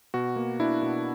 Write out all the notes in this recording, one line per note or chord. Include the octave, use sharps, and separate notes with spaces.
B2 F#4
A#3
D4 E4
B2